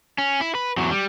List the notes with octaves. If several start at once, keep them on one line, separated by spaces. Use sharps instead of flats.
C#4
E4
B4
E2 F#3
G3